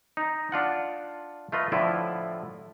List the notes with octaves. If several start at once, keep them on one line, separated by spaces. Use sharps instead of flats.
D#4
D4 F4 F#5 A5
A3 F4 B4 D#5
A2 D3 F3 E4 F4